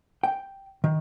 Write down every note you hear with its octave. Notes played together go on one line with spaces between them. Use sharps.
G5
D#3